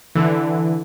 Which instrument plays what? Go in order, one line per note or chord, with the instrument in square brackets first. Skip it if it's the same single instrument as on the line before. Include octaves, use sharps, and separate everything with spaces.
[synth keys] D3 E3